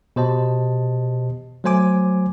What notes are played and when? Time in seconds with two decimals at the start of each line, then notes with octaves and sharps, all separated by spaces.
0.16 B2 G4 C5 D#5 A5
1.64 F#3 A3 C5 G#5 D6